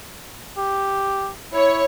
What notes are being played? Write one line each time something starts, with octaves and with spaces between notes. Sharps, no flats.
G4
E4 C#5